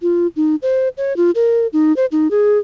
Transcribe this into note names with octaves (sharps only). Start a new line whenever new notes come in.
F4
D#4
C5
C#5
F4
A#4
D#4
C5
D#4
G#4